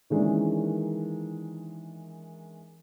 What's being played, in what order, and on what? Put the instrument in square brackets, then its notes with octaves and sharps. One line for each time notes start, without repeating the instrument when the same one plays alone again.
[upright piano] D#3 E3 G#3 A#3 C#4 D4